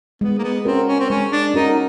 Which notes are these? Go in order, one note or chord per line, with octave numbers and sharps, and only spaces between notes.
G#3 B3
A#3
B3
C4 C#4 F#4 A#4
C#4
C4
G#3 C#4
D4
C#4 D#4 F#4 A#4